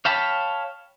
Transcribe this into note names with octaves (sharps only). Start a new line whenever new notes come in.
C#5 F5 G5 A5 B5